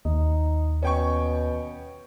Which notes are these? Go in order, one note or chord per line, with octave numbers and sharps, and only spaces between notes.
D#2 D#4
B2 C#4 G5 C#6